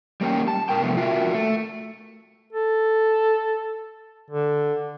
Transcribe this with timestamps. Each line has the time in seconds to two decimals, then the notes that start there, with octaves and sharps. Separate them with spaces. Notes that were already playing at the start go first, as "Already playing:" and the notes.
0.21 G3 A#3 C#4 G4
0.48 A5
0.69 A#2 A#4 G5
0.81 C3 F3 A3 B3
0.97 F4 F#4 A4 A#4 E5
1.34 A3
2.53 A4
4.30 D3